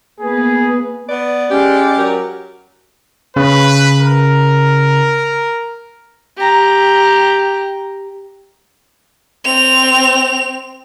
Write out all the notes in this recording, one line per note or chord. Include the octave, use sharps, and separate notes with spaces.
A#3 B3 G#4 B4
B3 D5
G#3 C#4 G4
F#3 A#4
C#3 B4
A#4
G4 A#5
C4 F7